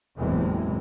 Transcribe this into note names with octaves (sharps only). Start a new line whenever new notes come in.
F#1 E2 A2 C3 E3 G#3